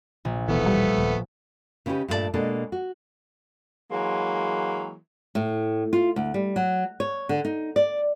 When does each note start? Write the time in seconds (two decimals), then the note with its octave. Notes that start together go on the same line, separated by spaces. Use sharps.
0.25 A#1
0.48 D#1 B2 E3 A3 B3
0.66 G3
0.98 D#1
1.86 C#3 B3 C#4 D#4 G4 B4
2.08 G2 A#2 A3 E4 D5 A5
2.34 B2 G#3 A#3 D4 A4
2.72 F#4
3.90 E3 F#3 G#3 A#3
5.35 A2
5.93 F4
6.16 D2
6.34 G3
6.56 F#3
7.00 C#5
7.29 D3
7.45 D#4
7.76 D5